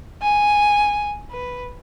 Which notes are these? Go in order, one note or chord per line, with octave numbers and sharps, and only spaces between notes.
G#5
B4